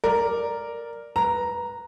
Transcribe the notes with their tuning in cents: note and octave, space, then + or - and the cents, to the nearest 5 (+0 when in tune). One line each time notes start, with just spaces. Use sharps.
A#4 +0 D5 +0
B4 -15 A#5 +0